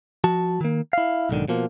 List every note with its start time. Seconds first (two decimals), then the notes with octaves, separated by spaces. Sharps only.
0.24 F3 F#4 A5
0.61 D#3 A#3
0.93 E4 F5
1.29 B1 G#2 D3 D#3
1.48 B2 F3 A#3